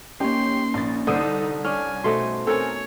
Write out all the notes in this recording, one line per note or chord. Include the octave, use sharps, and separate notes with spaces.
A#3 C#4 D#4 G4 C#5 C6
A#1 A6
C2 D3 D#4 A4 C5 D#6 D#7
C#4 D4 G#5 F6
B2 A3 D#4 C5 C6
C4 A4 A#4 C#5 G#5